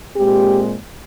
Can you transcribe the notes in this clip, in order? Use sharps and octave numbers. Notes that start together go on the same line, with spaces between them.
A#2 G#3 C4 G4